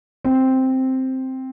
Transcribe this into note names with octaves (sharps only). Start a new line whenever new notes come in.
C4